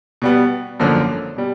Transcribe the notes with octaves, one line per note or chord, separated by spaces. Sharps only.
B2 G3 B3
G#1 F#2 D3 F3 A#3
B2 G3